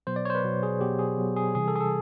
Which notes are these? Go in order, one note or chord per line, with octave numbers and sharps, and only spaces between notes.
B2 F#3 B3 C5
D5
C#5
C5
B4
B2 F#3 B3
G#4
B2 F#3 B3 G4
G#4
B2 F#3 B3
G#4
C3 E3 G3 G#4
A4
G#4
A4